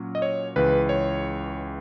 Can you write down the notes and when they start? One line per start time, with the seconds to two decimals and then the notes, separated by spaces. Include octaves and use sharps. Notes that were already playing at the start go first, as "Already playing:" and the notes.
Already playing: A#2 F#3 C#4
0.15 D#5
0.22 C#5
0.56 C#2 C#3 E3 B4
0.89 C#5